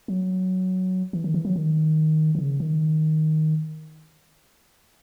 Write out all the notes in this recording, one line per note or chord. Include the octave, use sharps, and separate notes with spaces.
F#3
E3
D#3
E3
F#3
D#3
D#3
C#3
D#3